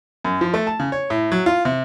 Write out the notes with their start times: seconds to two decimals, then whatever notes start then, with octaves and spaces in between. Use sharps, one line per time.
0.25 F#2
0.41 F3
0.54 A3
0.67 A5
0.80 C#3
0.92 C#5
1.10 A2
1.32 F#3
1.46 F4
1.65 C3